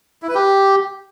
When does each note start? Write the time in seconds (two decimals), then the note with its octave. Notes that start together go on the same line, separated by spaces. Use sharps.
0.22 E4
0.28 B4
0.35 G4